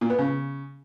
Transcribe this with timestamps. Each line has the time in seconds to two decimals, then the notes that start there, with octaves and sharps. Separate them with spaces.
0.01 A#2
0.10 B3
0.18 C#3